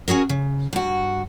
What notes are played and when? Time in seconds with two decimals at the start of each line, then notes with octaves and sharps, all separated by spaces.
0.08 C#4 F#4 G#4 A#4
0.29 C#3
0.73 G2 F#4